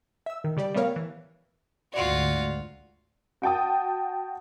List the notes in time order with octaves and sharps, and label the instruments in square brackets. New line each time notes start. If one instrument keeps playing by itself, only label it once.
[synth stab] E5 E6
D#3
C#3 G3 G4 D5
G3 A3 B3 A#4 C#5 F5
E3
[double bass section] D2 G#2 [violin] F4 F#4 [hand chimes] D5
[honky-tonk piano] F#4 G5 A5 D#6